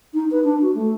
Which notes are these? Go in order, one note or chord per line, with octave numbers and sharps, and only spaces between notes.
D#4
B4
D4
F#4
A3